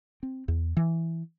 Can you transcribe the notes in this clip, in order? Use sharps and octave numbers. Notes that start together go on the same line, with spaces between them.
C4
E2
E3